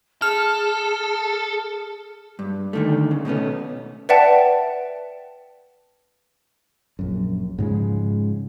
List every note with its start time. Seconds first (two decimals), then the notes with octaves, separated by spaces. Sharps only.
0.22 G#4 A4 F6
2.39 G2
2.73 D3 D#3 A3
3.11 C#3
3.25 B2 A3 B3 C#4
4.09 B4 D5 E5 F#5 G5 A5
6.99 A#1 F#2
7.59 G#2 C#3 F3 G#3